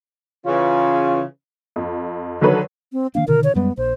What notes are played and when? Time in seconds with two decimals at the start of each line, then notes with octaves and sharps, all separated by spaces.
0.46 C#3 E3 C#4 F4
1.76 F2
2.41 D3 D#3 F#3 A4 B4 C#5
2.93 C4
3.15 D#3 A#3 D4 F5
3.28 B2 D3 D#3 A#4
3.44 C#5
3.55 F#2 G3 G#3 B3
3.77 A#1 C5